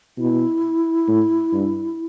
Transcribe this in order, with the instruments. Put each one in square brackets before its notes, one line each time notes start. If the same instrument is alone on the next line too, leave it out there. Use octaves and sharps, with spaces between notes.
[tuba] B2 [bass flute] E4
[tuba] A2
G2